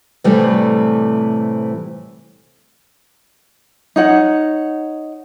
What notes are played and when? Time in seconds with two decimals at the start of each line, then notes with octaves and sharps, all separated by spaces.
0.24 A2 C3 E3 G3 A3
3.96 D#4 C#5 F#5